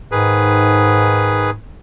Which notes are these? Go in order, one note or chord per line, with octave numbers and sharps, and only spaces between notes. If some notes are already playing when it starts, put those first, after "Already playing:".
G#2 D#3 G#4 B4